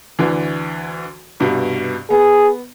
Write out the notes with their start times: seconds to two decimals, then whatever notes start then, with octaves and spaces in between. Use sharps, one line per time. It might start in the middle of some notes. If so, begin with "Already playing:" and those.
0.19 D2 D3 E3
1.40 C2 G2 B2
2.10 B3 G#4